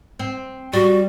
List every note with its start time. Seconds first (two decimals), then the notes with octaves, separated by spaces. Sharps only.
0.19 C4
0.73 G3 F#4